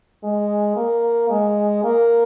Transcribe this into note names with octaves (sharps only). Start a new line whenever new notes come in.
G#3
A#3
G#3
A#3